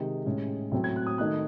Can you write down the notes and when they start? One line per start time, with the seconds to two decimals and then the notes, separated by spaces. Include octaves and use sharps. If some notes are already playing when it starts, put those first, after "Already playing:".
Already playing: C3 D#3 G#3 D#4
0.26 A2 G#3 C#4
0.72 A2 F#3 A3 C4
0.84 G#6
0.96 F#6
1.07 D#6
1.18 D#3 A3 D#4 F#6